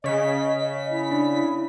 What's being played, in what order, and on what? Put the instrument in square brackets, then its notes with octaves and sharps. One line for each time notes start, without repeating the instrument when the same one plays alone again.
[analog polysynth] C#3 B6 [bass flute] D#5
[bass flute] E4
[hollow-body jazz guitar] D4